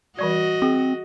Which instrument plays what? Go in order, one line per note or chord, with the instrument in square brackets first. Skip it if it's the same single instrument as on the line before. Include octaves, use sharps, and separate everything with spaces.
[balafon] E3 G3 D5 [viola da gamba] F#4 D#5
[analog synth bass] C4 [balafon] G#4